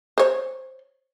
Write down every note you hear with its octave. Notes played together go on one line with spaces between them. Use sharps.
C5 C#5